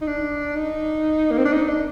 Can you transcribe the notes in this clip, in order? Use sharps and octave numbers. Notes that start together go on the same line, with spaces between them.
D#4
D4
D#4
A#3
C4
D4
D#4
D4